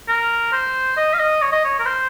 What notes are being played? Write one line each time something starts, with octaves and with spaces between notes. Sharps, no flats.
A#4
C5
D#5
F5
D#5
C#5
D#5
C#5
A#4
C5